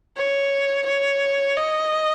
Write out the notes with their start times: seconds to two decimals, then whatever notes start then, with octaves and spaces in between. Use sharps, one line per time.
0.17 C#5
0.86 C#5
1.56 D#5